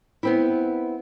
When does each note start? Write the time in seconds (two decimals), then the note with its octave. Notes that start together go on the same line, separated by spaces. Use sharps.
0.23 B3 C4 E4